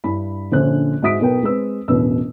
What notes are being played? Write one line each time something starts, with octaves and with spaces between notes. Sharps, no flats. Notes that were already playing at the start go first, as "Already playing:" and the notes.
G2 D4 E4 B5
A#1 D3 C#4 C5 F#6
G#2 F#4 E5 D#6 B6 D7
B1 B2 A#4 B4 G5
G#3 C4 B4 E6
E1 A1 B2 E3 B4 E6